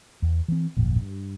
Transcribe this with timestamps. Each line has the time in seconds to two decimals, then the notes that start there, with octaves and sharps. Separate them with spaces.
0.22 E2
0.48 E3 C4
0.77 D1 G#1 F2 A#2
1.01 G2